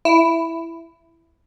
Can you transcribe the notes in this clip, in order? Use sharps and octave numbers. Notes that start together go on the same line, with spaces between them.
E4